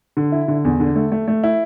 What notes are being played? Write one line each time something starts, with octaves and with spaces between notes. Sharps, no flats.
D3
E4
D3
E2
D3
A3
A3
A3
E4